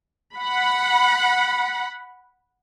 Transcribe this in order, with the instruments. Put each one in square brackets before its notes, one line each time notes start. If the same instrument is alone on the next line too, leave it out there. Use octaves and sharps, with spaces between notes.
[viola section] F#5 B5